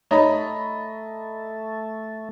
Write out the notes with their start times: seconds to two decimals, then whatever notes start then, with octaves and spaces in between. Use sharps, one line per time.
0.11 A3 D#4 C#5 D#5 A#5 B5